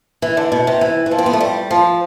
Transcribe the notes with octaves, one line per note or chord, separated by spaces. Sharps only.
E3
D3
B2
C3
E3
E3
F3
C4
B3
A3
G3
F3